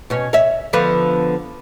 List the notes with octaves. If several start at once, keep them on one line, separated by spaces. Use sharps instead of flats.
B2 C#4
C#5 E5
D3 F3 B3